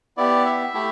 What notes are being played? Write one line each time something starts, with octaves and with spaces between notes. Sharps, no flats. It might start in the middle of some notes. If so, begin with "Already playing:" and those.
B3 E4 G4 D5
E5
A3 E4 G4